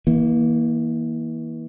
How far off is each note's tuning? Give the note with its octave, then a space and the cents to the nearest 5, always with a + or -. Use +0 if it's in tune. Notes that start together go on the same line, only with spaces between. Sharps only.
E3 -35 A#3 +15